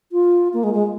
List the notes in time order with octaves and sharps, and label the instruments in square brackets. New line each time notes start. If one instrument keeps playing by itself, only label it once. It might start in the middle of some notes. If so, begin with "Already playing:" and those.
[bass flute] F4
A#3
G#3
G#3